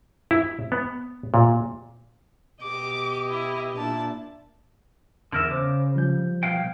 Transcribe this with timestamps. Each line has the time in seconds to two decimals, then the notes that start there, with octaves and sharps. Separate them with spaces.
0.31 E4
0.72 B3
1.34 A#2
2.62 B2 G4 D#5 D6
3.30 E4
3.76 A#2 D4 E4 A5
5.32 E2 D3 A#4 E5
5.51 C#3 C5 D6
5.95 F3 G3 G6
6.43 B2 F5 G5